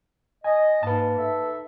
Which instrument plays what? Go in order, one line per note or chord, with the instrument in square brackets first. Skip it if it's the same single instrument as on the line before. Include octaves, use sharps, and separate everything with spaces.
[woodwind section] D#5 [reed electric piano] G#5
[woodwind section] G#2 A#3 [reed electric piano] B4 A5
[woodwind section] D#4 A4 E5